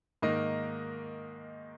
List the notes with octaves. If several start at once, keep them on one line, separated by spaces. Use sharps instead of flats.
G#2 D#3 A#3 D#5